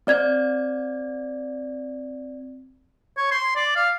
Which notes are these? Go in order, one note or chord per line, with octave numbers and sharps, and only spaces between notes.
C4 D5 G#6
C#5
C6
D5
F5